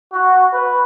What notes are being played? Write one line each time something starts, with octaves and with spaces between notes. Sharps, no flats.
F#4
B4